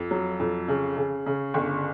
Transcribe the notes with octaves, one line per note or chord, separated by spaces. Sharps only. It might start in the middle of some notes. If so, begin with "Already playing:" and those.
Already playing: F2
F#3
F2
C#3
C#3
C#3
G1